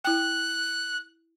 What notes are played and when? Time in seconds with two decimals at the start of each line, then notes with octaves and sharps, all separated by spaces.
0.05 E4 G5 F#6